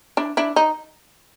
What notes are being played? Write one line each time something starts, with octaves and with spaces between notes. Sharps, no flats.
D4 E4
D4 E4
D#4